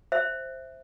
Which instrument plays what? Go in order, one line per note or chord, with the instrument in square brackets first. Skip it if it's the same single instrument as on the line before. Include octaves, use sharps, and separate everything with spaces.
[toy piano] C5 E5